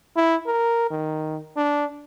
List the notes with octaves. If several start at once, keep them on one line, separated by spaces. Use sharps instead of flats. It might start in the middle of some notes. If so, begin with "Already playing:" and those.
E4
A#4
D#3
D4